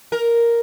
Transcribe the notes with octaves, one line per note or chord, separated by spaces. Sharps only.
A#4